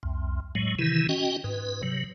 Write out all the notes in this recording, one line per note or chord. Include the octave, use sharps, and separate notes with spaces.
C2 F2
A2 F#3 G#3
C3 D#3 E3 E4
C#4 F#4 D#5 G5
G#2 B4
C3 F#3